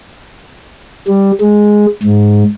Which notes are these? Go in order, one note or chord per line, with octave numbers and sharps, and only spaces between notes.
G3
G#3
G#2